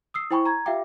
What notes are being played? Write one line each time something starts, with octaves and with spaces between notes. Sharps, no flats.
D#6 E6 C7
E4 C5 G5 G#5 B5 C#6
A#5 G#6
F4 G4 E5 F5 G5 D6